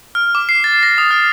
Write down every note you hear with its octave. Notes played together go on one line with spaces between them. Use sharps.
F6
D6
C7
A6
A#6
D#6
F6